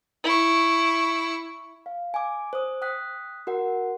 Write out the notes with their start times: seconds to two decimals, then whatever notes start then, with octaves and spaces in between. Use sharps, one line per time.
0.24 E4 C#6
1.86 F5
2.14 G#5 D6
2.53 C5 D#6
2.82 G5 D#6 F#6 B6
3.47 F#4 A#4 F#5